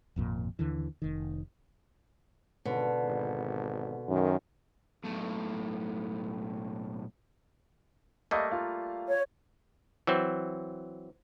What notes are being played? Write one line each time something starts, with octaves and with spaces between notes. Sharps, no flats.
G#1 F2 A#2
D#2 D3 E3
F1 D#3
G#1 B2 D3
G#1
F#2 D#3
B1 A2
G3 A3 A#3 D#5 F5 D#6
F4 F5
C#5
E3 F#3 C4